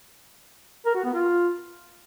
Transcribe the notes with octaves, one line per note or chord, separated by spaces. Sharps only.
A#4
F#4
B3
F4